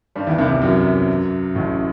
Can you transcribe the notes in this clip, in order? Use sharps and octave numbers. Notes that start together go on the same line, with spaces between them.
G2 G3
E2 E3
C2 C3
C2 C3
F#2 F#3
A1 A2